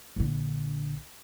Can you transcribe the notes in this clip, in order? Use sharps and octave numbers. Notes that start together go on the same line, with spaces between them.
A#1 D3